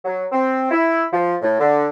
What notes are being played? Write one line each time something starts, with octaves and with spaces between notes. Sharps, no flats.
F#3
C4
E4
F3
A2
D3